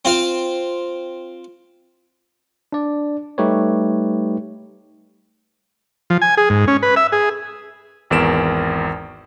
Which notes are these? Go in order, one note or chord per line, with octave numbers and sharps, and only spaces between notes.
C4 F4 C5 F5
D4 D5
G3 A3 D#4 G4 B4 C#5
F3
G#5
G#4
G#2
C#4
B4
E5
G#4
G#1 E2 A#4 D7 E7